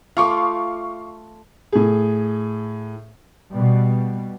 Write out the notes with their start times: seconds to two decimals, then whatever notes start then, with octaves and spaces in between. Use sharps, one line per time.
0.17 A3 F4 F5 C#6 D6
1.72 A2 G#4
3.51 B2 G3